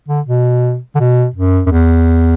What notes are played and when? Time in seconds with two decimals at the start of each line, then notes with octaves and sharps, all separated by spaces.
0.08 D3
0.26 B2
0.95 D3
1.00 B2
1.36 F#2
1.66 F#2
1.72 E2